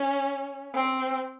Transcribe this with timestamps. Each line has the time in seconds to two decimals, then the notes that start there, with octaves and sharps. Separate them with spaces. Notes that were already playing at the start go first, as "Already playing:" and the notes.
Already playing: C#4
0.74 C4